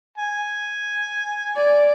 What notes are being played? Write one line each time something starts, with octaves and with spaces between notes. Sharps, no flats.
G#5
D5